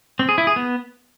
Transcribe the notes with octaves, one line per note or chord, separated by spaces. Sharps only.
C4
G#4
E4
G#4
B3